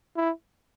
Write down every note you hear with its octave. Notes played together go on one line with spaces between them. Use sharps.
E4